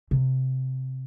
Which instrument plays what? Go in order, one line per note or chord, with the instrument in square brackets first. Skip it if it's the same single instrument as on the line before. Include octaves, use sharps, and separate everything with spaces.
[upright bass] C3